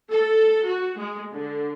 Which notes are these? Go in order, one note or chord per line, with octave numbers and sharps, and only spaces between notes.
A4
F#4
G#3
D3